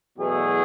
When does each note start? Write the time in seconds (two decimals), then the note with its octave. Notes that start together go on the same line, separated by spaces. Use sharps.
0.18 E2 B2 F#3 A3 G#4